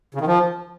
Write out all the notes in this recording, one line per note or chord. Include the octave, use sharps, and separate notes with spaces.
C#3
D#3
F3